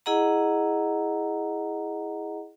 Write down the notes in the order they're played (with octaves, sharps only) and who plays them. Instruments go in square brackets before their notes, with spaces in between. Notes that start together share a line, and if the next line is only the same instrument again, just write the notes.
[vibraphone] E4 G#4 D#5 F#5 A#5